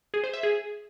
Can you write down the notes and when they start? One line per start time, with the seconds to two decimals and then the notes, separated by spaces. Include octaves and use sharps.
0.14 G#4
0.24 C5
0.33 E5
0.43 G#4